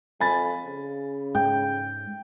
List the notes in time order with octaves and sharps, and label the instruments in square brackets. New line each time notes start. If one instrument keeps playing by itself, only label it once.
[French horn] F2 [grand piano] G#5 B5 A6
[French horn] C#3
[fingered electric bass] G#2 [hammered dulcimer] G5